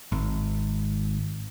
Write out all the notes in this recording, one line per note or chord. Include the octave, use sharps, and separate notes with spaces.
G#1